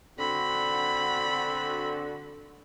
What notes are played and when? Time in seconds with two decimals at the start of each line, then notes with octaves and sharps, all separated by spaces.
0.19 D3 C4 F#4 B5